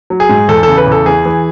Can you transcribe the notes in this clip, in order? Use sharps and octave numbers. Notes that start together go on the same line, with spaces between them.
F#3
G#4
G#2
E2 A4
C#3 A4
B4
E2
A4
E3 G#4
E3